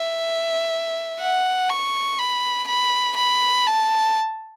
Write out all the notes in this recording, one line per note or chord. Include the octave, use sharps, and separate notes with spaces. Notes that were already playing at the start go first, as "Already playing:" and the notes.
Already playing: E5
F#5
C#6
B5
B5
B5
A5